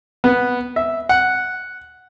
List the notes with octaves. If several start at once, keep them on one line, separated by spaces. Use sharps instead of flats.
B3
E5
F#5